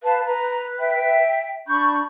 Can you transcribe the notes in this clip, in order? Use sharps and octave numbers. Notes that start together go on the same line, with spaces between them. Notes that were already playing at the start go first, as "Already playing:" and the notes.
B4 F5 A5
B4 A#5
E5 G5
D4 B5 C#6 G6